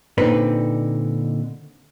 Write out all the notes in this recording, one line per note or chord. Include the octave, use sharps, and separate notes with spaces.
A#2 D3 C4 D#4 B4 D5